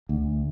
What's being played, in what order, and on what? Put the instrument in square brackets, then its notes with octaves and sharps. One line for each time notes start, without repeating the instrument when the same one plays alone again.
[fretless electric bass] D2